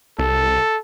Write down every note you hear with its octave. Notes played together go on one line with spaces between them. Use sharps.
C2 A4